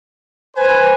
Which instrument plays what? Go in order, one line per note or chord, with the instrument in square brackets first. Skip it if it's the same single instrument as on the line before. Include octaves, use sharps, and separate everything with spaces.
[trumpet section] B4 G#5 [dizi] C5